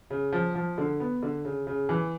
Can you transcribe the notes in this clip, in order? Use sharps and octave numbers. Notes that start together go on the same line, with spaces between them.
C#3
F3
F3
D3
B3
D3
C#3
C#3
E3